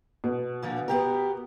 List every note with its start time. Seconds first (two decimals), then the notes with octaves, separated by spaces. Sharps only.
0.24 B2
0.62 A#2 D3 F3
0.88 B3 G4 A#4